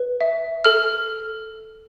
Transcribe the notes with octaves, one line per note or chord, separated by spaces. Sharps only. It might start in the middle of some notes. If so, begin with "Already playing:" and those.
Already playing: B4
E5
A4 F6